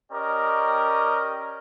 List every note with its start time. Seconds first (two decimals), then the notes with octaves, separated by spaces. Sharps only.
0.12 C#4 G4 A#4 D5 D#5